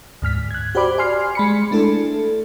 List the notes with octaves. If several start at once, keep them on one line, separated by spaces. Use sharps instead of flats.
D2 G#2 F6 B6
F#6 G#6
F#4 G4 C5 D5 B5 D6
D5 G#5 C6 F6 C7
G#3 B5 C#7
G#3 A3 D4 E4 A4